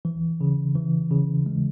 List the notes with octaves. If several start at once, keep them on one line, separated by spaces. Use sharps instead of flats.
E3
C#3
E3
C#3
G#3